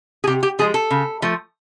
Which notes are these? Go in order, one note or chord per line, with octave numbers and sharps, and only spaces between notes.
G#4
C3 G4
G4
F3 G#3 G#4
A4
C#3
F3 A3